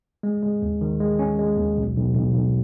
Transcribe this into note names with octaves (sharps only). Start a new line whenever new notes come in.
G#3
G#3
D#2
D#3
G#3
C#4
G#3
D#2
B1
B1
B1
B1